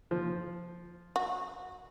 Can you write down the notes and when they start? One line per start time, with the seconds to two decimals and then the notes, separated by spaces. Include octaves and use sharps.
0.11 F3
1.16 F#4